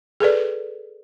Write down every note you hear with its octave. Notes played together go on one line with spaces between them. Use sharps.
G#4 A4 B4 D5